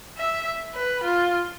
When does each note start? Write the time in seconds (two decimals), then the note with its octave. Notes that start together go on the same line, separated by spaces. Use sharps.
0.18 E5
0.75 B4
1.04 F4